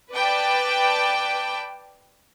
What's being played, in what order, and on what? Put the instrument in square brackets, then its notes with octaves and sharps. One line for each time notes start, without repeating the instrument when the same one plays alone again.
[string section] B4 D5 G5 A5